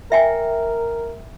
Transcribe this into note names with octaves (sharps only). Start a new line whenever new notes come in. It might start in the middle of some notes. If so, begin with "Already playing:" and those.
A#4 E5 G5 G#5